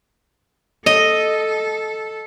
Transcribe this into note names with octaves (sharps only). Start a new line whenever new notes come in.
A4 D#5